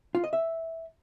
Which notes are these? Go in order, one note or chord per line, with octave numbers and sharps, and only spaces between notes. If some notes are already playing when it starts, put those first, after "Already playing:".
F4
D#5
E5